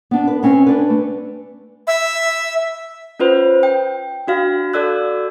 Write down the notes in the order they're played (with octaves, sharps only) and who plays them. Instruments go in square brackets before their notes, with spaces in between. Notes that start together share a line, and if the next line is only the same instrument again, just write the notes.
[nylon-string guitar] B3 D4
B4
C4 C#4 E5
D4 B4
A3
[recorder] E5
[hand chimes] C#4 F4 B4 C5
G5
D4 F#4 F5
F#4 A4 D5 E6 F#6